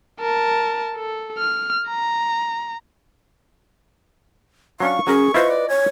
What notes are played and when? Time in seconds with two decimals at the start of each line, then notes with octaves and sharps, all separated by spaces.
0.20 A#4 A5
0.95 A4
1.38 F6
1.88 A#5
4.80 F#3 C#4 D4 F5 C#6
5.07 F#3 C#4 G#4 A#4
5.34 E4 F4 B4 C5 D#5
5.49 D5
5.69 C#5 G#5